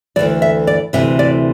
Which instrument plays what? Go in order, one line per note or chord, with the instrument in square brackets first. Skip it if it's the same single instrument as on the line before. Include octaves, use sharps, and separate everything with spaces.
[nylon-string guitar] D2 C3 E3 D5
E5
D5
D2 C3 E3 E5
D5